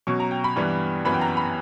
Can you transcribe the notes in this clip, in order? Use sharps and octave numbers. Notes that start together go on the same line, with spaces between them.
B2 F#3 C#4 C#6
A#5
G5
B5
G2 E3 G3 B3
F#2 E3 B3 B5
G5
A#5
B5